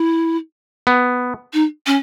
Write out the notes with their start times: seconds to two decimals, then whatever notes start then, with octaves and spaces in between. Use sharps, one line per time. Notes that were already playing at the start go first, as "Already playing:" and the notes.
Already playing: E4
0.87 B3
1.53 D#4
1.86 C#4